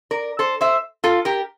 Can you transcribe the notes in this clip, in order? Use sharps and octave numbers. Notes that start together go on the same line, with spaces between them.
A#4 D5
A4 C5
C5 E5
F4 A4
G4 A#4